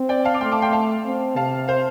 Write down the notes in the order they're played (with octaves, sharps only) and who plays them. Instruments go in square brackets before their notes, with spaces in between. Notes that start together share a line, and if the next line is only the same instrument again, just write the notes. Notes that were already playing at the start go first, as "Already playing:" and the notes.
Already playing: [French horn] C4
[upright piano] D5 G5
F5 A5
D6
[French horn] A3 [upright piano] G5 C6
[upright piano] A5 D6
G5 C6
F5 A5
[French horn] C4
[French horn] C3 [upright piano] F5 A5
[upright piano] C5 F5